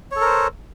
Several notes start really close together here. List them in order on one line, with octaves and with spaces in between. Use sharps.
C#5 A4 A#4 C5